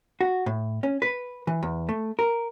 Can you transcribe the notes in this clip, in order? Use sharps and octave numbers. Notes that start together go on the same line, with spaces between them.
F#4
A2
C#4
B4
E3
E2
A3
A#4